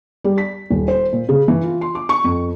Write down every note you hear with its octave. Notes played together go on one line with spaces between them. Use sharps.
G3
B6
D#1
C5
A#2
C#3
E3
F4
C6
D6
C#6
F2